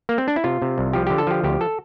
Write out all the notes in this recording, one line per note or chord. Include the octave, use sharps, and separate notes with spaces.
A#3
C4
D4
E4
C3 F4
C3
C2
F3 G4
D3 G4
A4
F3 G4
D2 G4
A4